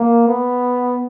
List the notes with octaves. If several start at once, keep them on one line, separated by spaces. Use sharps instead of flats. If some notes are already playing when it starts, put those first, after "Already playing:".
Already playing: A#3
B3